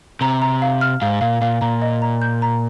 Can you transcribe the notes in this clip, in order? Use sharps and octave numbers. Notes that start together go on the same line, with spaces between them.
C3 A#5
A#5
F5
F6
G#2 F5
A#2 F5
A#2 F5
A#2 A#5
D#5
A#5
G6
A#5